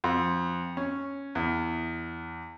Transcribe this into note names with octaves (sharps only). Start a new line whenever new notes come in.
F2
C#4
E2